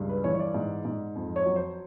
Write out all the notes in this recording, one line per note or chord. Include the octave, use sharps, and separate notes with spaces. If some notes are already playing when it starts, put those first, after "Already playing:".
Already playing: C#2 G2
B4
E3 C#5
C#5
D5
G#2
G#2
F2
C#5
F#3
C5